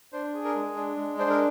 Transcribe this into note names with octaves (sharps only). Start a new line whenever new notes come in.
D4 C5
G#4
A#4
G#3
D4
G#3
D4 C5
A#4